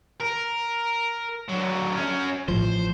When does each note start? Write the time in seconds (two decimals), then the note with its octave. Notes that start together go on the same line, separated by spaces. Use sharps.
0.21 A#4
1.48 D3 F#3
1.96 C#4 F#4
2.48 A1 A2 F3 C5